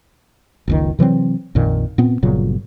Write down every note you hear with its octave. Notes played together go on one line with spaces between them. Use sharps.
F#1 C#2 D#3
C3 E3 F#3 C4
A#1 F2 A#2 D#3
A#2 B3 C4
G1 A#2 C#3 F#3